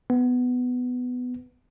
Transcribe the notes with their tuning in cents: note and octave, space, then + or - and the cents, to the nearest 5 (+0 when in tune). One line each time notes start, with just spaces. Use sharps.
B3 +10